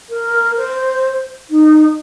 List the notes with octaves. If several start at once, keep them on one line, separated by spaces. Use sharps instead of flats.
A#4
C5
D#4